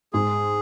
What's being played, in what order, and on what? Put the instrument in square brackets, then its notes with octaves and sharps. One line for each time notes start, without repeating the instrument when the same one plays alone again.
[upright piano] G#2 [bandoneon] G#4